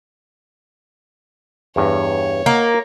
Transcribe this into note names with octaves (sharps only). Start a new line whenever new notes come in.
E2 G2 C#5
A#3 D#5 F#5